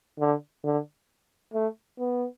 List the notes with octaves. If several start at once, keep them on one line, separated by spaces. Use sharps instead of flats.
D3
D3
A3
B3